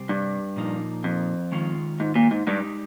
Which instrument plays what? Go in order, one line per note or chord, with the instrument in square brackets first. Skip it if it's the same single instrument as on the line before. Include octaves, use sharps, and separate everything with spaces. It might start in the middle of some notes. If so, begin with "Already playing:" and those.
Already playing: [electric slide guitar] C3 G3 C4 G4 C5
[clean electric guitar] G2
[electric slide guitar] A#2 F3 A#3 D#4
[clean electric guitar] F2
[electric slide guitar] D#3 G#3 C#4 F4
[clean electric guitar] G#2
A#2
G#2
[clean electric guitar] G2 [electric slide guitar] G#3 D#4 G4